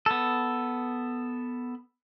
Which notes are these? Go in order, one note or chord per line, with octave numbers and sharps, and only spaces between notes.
B3 A4